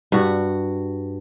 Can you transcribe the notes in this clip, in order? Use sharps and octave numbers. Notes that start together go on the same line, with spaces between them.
G2 F#4